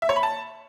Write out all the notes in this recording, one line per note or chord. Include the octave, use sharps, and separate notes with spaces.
E5
C#5
B5
A5